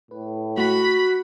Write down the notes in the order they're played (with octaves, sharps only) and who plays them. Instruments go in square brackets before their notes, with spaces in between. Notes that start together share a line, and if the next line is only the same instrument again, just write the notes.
[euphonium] A2 [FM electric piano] B4
[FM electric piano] A3 [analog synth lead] F#4 [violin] B5